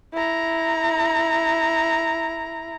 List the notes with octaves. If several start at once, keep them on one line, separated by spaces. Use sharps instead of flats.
E4 A#5